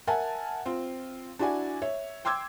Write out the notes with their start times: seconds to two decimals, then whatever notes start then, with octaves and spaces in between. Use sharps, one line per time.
0.07 A#4 E5 F#5 G#5 A5
0.66 C4 F4
1.39 D4 E4 F#4 D5 G#5
1.82 C#5 E5
2.25 G5 C6 D6 E6 G#6